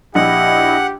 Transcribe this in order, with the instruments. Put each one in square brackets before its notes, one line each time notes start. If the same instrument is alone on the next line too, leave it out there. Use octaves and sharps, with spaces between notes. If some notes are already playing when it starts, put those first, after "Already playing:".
[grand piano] A#1 [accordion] E4 D#5 [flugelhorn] G4 [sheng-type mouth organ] F#5